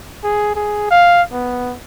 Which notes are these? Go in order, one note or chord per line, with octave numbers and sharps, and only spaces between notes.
G#4
G#4
F5
B3